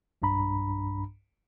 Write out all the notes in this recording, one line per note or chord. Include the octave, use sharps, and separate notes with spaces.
B1 G2 D4 A#5 B5